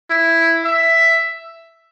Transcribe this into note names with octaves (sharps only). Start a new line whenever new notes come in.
E4
E5